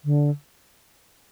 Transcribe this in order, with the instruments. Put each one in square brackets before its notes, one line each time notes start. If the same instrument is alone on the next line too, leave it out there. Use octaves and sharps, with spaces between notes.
[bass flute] D3